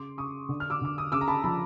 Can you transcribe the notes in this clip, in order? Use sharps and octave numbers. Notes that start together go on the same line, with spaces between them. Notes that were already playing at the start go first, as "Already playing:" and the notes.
Already playing: C#3 C6 D6
C#3 C#6 D#6
D3
F6
D6 E6
D3 D6
D#6
C#3 D6 E6
A#5
A5 B5
F3 A5 B5